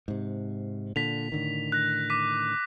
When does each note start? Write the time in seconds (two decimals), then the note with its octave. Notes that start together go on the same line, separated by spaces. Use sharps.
0.08 G#2 C3
0.96 A#2 D3 B6 F7
1.32 A2 D3 D#3
1.72 F#6 A#6
2.10 D6 B6 D#7